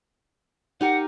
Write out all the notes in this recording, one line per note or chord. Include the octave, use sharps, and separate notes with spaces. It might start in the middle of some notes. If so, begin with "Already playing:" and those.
D#4 G4 A#4 F#5